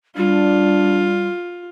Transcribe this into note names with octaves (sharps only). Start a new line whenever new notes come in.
G3 D4 F4